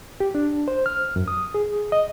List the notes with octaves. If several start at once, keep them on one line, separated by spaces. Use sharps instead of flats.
G4
D4
C5
F6
F#2
D#6
G#4
D#5